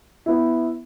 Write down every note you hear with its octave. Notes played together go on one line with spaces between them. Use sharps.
B3 E4